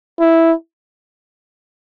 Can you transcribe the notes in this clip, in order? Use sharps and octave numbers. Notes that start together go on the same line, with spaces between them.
E4